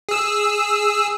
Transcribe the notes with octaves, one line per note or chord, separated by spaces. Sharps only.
G#4 E6